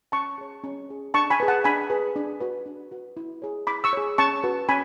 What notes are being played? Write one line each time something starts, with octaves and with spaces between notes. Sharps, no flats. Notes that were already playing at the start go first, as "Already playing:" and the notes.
C#4 A5 C#6
G#4 C#5
C#4
G#4 C#5
D4 A5 C#6
G#5 B5
G#4 B4
F#5 A5
D4 G#5 B5
G#4 B4
D4
F#4 B4
D4
F#4 B4
E4
G#4 C#5
E4 B5 D6
C#6 E6
G#4 C#5
C#4 A5 C#6
F#4 B4
C#4 G#5 B5